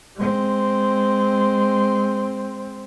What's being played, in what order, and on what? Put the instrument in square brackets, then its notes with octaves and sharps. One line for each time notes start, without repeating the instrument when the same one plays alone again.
[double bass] G#3 C4